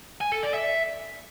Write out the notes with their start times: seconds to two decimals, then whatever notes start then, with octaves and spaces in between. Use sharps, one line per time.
0.21 G#5
0.32 A4
0.43 D5
0.54 E5